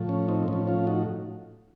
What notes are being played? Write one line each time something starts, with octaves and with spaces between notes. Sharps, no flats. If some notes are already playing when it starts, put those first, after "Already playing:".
Already playing: A2 F3
C#4
C4 D#4
A2 F3 C#4
C#4 F4
D#4 F#4